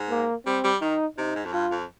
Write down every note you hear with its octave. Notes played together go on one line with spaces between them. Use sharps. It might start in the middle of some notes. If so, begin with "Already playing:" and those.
Already playing: G#2
A#3
G3 C4
G3
D#3 D#4
C3 D#4
G#2
F2
G2 F4
F2